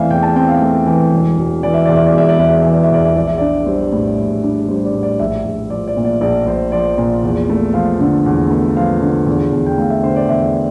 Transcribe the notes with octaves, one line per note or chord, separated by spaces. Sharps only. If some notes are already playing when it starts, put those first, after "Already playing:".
Already playing: E2 E3 A3 C4 D5 E5 F5
E2 G5
A5
C4 G5
F5
A3
E3
E1
E1
E3 D5
E5
E2 D5
E5
D5
E1 E5
D5
E1 E5
D5
E3 E5
D5
E5
E2 D5
E5
A#1 D5
E5
D4 D5
G3 C5
A2
A#1
D4
G3 C5
D5
A2
D5
A#1 E5
A#1
F3 D5
D5
A#2
D5
A#1 D5
A#1 C5
F3 D5
A#2
E2
A3
F3 F5
D3
E2
A3
F3 F5
D3
E2
E2
G5
A3 F5
E5
D3 C5
D5
E2 E5